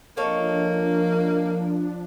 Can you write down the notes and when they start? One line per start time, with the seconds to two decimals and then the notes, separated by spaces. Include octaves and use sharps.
0.17 F3 A#3 D4 D#4 A4 C#5